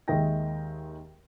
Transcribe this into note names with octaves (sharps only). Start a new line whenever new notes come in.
D#2 D#3 G#3 E5 G5 A#6